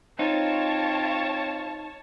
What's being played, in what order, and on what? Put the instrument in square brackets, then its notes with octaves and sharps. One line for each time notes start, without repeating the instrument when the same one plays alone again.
[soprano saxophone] C4 [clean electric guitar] D#4 [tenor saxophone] F4 [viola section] C#5 A5